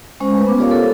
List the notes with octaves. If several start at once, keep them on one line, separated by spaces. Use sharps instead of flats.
G#3 C#4 C5
A3 B4
B3 D6
F4 G4 A#4 C#5 D5 F5
A4